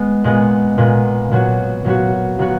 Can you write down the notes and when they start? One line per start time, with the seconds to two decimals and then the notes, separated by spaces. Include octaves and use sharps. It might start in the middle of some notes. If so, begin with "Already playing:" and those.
Already playing: G#3 B3
0.24 A#2 G#3 B3
0.78 A#2 G#3 B3
1.31 A#2 F#3 B3 F#4
1.85 A#2 F#3 B3 F#4
2.39 A#2 F#3 B3 F#4